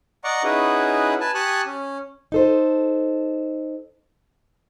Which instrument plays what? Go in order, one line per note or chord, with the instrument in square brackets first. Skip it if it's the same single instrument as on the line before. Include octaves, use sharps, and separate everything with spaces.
[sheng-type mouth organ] D5 D#5 F#5 A#5 C#6 D6
C#4 D#4 E4 F#4 G#4 B4
B4 G#5 A5
G4 G#5 A5 C#6 D#6 F#6
C#4
[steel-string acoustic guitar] D#4 A4 C5